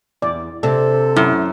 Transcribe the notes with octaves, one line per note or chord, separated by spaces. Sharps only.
E2 D5
C3 D4 A4
F#2 E4